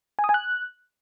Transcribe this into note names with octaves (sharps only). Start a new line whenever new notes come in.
G#5
D#6
G#5
F#6